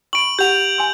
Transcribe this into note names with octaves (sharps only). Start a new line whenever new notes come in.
B5 C#6 D7 F#7
G4 F#5 G6 F7
G#5 C6